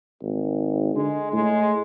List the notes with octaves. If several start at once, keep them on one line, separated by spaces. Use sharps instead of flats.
G#1
D3 G#3
A2 G#3